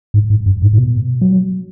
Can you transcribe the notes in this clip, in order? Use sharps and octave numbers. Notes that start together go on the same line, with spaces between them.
G#2
G#2
F#2
G#2
G#2
B2
F#3